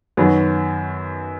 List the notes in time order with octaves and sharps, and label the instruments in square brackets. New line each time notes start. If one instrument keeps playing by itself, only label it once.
[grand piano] F#2 D#3 F#3 B3